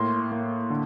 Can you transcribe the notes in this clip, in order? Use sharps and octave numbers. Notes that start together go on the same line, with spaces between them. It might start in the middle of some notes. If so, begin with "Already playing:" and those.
Already playing: A2 A#3 C6
A#3
D3